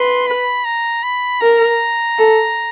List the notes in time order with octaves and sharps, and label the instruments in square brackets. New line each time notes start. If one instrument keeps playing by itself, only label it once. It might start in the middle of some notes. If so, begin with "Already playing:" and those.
Already playing: [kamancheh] B4 [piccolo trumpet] C6
[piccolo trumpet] B5
A#5
B5
[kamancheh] A#4 [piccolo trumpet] A#5
[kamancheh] A4